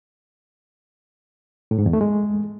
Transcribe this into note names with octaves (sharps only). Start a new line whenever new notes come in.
A2
G#2
E2
A3
G#3